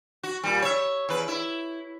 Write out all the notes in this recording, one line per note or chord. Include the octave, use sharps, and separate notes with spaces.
F#4
A#2 G3
C#5 E5
E2 B4
E4